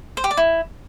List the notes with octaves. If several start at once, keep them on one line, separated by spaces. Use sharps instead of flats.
C5
G4
D5
E4